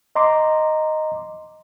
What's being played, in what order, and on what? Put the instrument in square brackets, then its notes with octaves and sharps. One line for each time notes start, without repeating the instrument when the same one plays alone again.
[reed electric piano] D#5 A#5 C6 D6